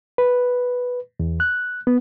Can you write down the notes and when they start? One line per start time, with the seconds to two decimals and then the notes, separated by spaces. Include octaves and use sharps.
0.18 B4
1.20 E2
1.40 F#6
1.87 B3